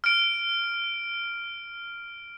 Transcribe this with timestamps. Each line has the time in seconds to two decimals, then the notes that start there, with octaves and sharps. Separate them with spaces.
0.04 F6 D7